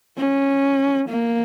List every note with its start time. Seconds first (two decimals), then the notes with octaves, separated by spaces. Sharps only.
0.17 C#4
1.09 A#3